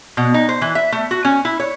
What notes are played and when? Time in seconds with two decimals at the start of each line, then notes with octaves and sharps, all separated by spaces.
0.17 B2
0.34 D#4
0.49 C5
0.62 E3
0.75 E5
0.92 A3
1.11 F#4
1.25 C#4
1.45 E4
1.60 C#5